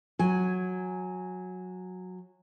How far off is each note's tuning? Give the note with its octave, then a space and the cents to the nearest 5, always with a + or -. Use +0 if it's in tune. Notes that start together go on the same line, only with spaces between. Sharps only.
F#3 -15 G#5 +0